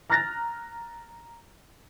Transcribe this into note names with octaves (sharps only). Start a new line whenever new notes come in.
A#5 F6 F#6 A6 A#6